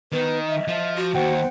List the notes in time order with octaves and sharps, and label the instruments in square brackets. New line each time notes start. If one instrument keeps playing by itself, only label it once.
[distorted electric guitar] D#3 [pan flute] B3 [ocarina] B4
[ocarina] D#5 [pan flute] E5
[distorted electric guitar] F3 [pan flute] E5
[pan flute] F#4
[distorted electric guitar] D#2 [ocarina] C5 [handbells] F#5 G5